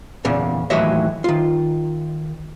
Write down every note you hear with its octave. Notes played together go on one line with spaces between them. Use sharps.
E2 A#2 C#3
D#2 A2 E3 F#3 D#5 E5
D#3 F4